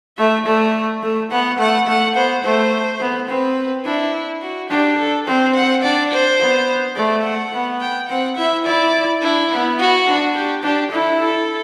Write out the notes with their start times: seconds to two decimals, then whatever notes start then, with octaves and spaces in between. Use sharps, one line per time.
0.18 A3 E5
0.46 A3 D5
1.03 A3
1.31 B3 F#5
1.59 A3 F#5
1.88 A3 F#5
2.16 B3 C5
2.44 A3 C5
3.01 B3
3.29 C4 B4
3.85 D4 E4
4.42 F#4
4.70 D4 G4
4.99 A4
5.26 C4 C5
5.55 F#5
5.83 D4 D5
6.11 C5
6.39 B3
6.96 A3 D5
7.24 F#5
7.53 B3
7.81 G5
8.09 C4 F#5
8.37 E4 E5
8.66 E4 D5
9.22 D4 E4
9.51 B3
9.79 F#4
10.07 D4
10.35 G4
10.63 D4 G4
10.91 E4 A4
11.20 A4